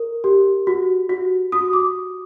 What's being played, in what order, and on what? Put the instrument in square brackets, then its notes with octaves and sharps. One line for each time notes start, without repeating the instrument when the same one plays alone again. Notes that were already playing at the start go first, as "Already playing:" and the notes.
Already playing: [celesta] A#4
G4
F#4
F#4
F#4 D#6
D6